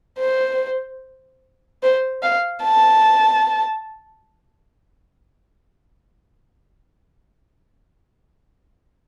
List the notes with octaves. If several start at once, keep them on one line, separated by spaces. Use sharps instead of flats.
C5
C5
F5
A5